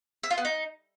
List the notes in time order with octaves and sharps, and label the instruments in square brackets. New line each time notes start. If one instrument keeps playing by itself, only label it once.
[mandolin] E5
F4
B3
D#4